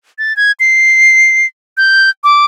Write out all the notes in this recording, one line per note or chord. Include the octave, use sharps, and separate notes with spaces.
A6
G#6
C7
G6
D6